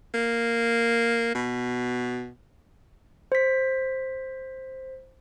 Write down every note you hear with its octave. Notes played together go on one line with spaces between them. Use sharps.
A#3
B2
C5 B6